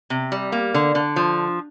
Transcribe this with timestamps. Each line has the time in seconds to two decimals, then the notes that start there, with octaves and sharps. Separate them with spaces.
0.10 C3
0.32 G3
0.52 A#3
0.74 D3
0.95 D3
1.16 F3